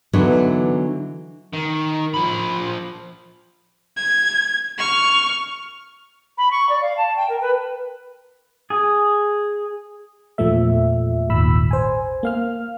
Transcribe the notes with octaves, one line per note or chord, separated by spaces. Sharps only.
D3 E3 F#3 B3 D4 D#4
D#3
F3 B5
G#6
C#6 F6
B5
C#6
D5
F5
A5
G5
A#4
B4
G#4
E2 A#2 F3 A3 E5
G#1 D#2 A#2 B5 E6
C5 G#5
A#3 F5 F6